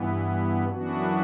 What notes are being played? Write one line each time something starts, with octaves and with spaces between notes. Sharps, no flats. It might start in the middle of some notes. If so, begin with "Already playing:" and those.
Already playing: G2 E3 B3
F#2 E3 B3 D4 F#4